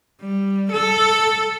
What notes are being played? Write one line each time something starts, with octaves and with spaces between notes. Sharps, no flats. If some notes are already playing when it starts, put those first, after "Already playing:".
G3
A4